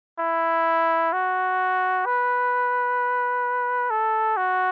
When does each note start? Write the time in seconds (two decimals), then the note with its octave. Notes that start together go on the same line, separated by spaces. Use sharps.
0.19 E4
1.13 F#4
2.06 B4
3.90 A4
4.37 F#4